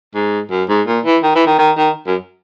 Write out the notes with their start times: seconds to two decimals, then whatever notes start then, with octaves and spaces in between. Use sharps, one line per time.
0.15 G#2
0.51 F#2
0.69 G#2
0.87 A#2
1.05 E3
1.23 D#3
1.35 E3
1.47 D#3
1.58 D#3
1.77 D#3
2.07 F#2